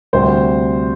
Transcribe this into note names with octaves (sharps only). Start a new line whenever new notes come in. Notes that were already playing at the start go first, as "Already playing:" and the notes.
D2 C3 G3 C4 C5